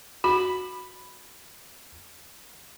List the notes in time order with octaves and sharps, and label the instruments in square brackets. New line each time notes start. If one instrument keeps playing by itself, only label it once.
[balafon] F#4 [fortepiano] B5